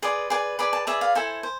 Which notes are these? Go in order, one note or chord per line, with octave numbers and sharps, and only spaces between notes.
G#4 B4 D5 C6
G#4 B4 D5
G#4 B4 D5 B5
A5
G#4 B4 D5 E5
F5
E4 A4 C5 G#5
C5